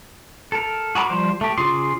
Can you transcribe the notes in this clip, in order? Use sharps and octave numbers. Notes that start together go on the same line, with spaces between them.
A4 A#4
F#4 G#4 A#5 B5 D6
F3 G3 C5
A3 G4
C#3 F4 G#4 C6 D6